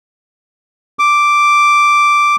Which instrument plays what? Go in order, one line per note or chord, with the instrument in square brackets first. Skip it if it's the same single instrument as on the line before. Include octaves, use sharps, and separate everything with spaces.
[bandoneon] D6